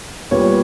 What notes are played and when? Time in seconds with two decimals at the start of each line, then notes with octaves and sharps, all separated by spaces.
0.31 A#2 G3 B3 C#5